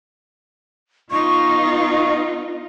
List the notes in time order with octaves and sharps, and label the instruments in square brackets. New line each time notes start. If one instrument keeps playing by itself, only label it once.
[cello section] B3 D#4 F4 [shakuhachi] C#6